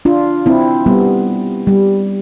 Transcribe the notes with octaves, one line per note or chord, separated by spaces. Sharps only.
D4 F4
C4 E4
G3 B3
G3